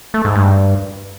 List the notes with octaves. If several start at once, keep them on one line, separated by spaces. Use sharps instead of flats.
A3
G#2
G2